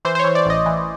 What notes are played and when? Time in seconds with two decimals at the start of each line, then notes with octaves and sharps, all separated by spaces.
0.05 E3 C5
0.15 C5
0.19 C#5
0.24 E3
0.35 D5
0.45 A1 D#5
0.66 E3